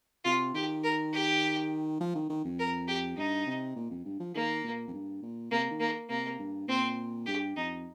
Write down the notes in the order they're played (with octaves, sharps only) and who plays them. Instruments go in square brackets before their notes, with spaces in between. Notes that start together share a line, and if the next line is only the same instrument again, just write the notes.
[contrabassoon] C3 [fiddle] F4
[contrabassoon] D#3 [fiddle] G4
[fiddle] A#4
G4
[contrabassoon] F3
D#3
D#3
F2
[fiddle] A#4
G4
[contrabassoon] G2 [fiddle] D#4
[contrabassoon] C3
A#2
F2
G2
F3
[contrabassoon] D#3 [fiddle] A#3
[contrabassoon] A#2
F2
G2
A#2
[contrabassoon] C3 [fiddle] A#3
[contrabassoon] D#3
[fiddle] A#3
[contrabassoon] C3 [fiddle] A#3
[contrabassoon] G2
[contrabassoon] A#2 [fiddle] C4
[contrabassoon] G2 [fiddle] G4
[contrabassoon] F2 [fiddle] D#4